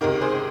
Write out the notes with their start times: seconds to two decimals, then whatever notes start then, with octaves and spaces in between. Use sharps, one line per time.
0.01 C#2 C3 D#3 A#4
0.21 G#4 C5